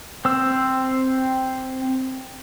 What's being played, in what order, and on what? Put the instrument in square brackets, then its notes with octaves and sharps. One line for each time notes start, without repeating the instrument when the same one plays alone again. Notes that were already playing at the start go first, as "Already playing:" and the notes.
[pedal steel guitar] C4 E6